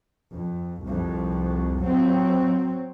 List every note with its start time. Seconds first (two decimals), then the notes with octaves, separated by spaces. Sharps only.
0.31 F2
0.83 C2 F2
1.81 F#3 C4